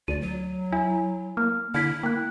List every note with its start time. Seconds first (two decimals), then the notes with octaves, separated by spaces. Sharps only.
0.08 D2 D5 D#7
0.21 F#3
0.72 E4 G#5
1.37 A#3 F6
1.74 D3 E4 F6 G#6 B6
2.03 A#3 G5 F#6